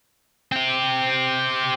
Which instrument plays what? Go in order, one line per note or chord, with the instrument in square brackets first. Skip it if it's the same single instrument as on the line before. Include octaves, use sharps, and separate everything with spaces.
[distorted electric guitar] C4 G4